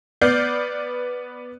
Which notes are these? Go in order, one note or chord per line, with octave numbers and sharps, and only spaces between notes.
B3 D5 F6 G6 C7